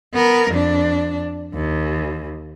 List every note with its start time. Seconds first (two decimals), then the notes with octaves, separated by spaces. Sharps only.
0.14 B3 A#4
0.51 F2 D4
1.54 D#2